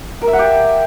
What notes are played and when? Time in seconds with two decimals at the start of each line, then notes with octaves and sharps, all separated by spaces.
0.22 A#4
0.27 E5
0.33 F#5
0.39 G4